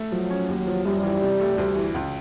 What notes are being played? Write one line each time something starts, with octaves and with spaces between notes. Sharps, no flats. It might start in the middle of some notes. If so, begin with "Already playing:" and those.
Already playing: A3
F3 F#3
C#4
D#2
F3
F#2 G3
E3
C3
A3
D2
E3
C#2